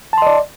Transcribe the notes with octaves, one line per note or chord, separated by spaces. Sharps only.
D5 D#5 A5 C6